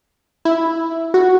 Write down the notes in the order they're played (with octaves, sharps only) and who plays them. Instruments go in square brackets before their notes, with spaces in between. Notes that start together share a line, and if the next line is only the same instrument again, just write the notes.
[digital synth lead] E4
F#4